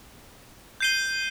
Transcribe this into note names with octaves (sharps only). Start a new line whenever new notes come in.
G6 C7 D#7 G7